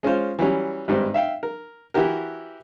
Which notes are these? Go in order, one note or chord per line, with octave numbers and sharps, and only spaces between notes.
G#3 C#4 F4 C5
E3 F#3 G3 C#4
G#1 G2 C5
E5 F5 G5
A#4
E3 E4 F#4 G4 A#4